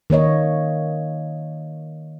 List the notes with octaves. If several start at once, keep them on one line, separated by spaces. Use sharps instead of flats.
D#3 A#3 C#5 D#5